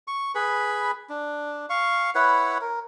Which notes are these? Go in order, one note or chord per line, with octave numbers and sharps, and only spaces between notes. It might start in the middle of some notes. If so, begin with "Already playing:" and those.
C#6
G#4 B4 B5
D4
F5 C#6
E4 B4 C#5 F#5
A#4